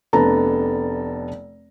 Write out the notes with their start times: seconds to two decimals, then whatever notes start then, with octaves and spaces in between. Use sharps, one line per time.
0.13 F1 B3 D4 A4 A#5